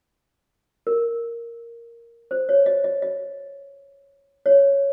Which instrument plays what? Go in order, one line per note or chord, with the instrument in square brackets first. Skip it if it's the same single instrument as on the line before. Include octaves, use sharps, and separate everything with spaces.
[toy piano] A#4
C5
C#5
D#5
D#5
D#5
C#5